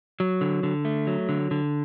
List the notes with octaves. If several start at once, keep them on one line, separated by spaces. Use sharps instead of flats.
F#3
D3
D3
A3
F#3
D3
D3